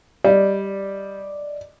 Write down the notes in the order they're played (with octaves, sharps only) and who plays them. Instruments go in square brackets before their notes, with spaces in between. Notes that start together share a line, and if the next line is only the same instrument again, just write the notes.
[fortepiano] G3 [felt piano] D5 D#5